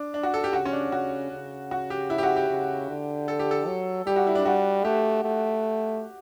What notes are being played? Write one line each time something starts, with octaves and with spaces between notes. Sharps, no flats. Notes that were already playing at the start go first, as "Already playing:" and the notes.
Already playing: D4
D4
F#4
A4
G4
C#3 F#4
C#4
D4
C#3 F#4
C#3
F#4
G4
E4
G4
F#4
G4
C#3
D3
A4
G4
A4
F#3
G3 G4
F#4
E4
D4
G3 F#4
A3 G4
A3